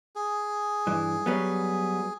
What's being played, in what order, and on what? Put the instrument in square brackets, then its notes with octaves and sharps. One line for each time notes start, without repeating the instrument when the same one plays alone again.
[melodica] G#4
[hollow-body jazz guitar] G2 E3
F#3 G3 B3